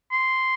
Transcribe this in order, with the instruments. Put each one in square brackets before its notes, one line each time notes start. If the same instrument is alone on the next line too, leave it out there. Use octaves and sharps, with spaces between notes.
[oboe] C6